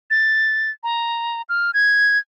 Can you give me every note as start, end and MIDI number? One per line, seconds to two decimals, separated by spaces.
0.11 0.70 93
0.84 1.42 82
1.49 1.71 89
1.74 2.18 92